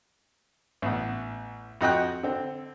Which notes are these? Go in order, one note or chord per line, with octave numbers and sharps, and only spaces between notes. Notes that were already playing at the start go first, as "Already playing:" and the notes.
A1 B3
F2 F#4 D#5 G5 F#6
D3 C4